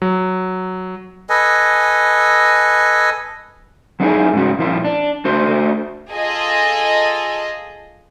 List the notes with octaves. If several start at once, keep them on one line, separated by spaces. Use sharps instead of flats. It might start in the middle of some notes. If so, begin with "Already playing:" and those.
F#3
A4 B4 D#5 G#5
F#3 B3 D#4 E4 G#4 G#5
G#2 C#3 F#4
A#2 F3 E4 F4
D4
A3 D4 F#4 C5
F4 G#4 A4 D#5